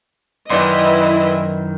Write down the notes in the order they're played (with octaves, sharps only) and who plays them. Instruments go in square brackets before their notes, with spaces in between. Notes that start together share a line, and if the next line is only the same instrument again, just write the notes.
[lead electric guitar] F#2 D#3 [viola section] E3 E4 D#5 [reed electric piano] D5 C6